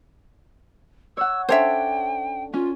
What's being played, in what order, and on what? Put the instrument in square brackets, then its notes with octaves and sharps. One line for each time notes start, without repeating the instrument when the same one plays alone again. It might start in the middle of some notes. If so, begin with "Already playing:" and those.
[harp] C#5 F#5 [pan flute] E6
[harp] C#4 D4 A4 [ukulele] C5 C#5 E5 [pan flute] G5
[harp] C#4 [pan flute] F4